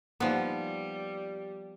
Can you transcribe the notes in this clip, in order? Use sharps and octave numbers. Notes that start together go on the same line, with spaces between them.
F3 G3 A#3 B3 D#4